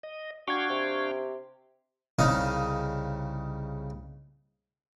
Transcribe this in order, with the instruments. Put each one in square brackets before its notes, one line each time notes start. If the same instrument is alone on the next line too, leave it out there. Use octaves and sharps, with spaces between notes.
[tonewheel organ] D#5
[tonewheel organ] D4 F5 G5 [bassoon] F#4 [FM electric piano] C#6 G#6
[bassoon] C3
[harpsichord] C2 C#3 D#4 F5 D#6